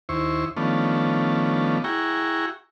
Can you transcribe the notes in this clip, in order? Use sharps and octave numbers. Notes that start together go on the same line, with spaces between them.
D#2 E4 C5 C#6
D#3 F3 A3 B3 C#4 D4
E4 F#4 G#4 G5 A#5 C#6